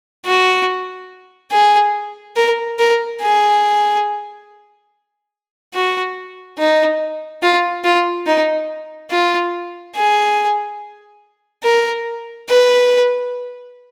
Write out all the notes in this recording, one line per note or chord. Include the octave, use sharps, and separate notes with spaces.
F#4
G#4
A#4
A#4
G#4
F#4
D#4
F4
F4
D#4
F4
G#4
A#4
B4